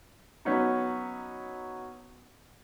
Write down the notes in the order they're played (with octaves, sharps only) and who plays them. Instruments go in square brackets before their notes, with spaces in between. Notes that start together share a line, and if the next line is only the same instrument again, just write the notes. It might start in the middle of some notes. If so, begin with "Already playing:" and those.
[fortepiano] F#3 B3 C#4 D#4